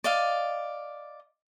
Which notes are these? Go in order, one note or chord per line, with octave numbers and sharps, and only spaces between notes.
D5 D#5 F5